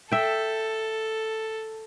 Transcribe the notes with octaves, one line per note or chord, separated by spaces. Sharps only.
A4 E5 G5